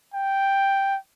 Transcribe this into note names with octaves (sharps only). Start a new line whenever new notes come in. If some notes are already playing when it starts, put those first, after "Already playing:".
G5